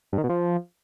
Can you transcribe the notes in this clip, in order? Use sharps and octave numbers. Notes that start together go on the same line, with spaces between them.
G2
D#3
B2
F3